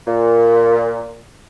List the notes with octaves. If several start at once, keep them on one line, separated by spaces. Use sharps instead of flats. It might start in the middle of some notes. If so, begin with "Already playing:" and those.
A#2